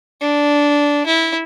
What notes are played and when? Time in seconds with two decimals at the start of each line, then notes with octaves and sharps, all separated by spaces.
0.21 D4
1.06 E4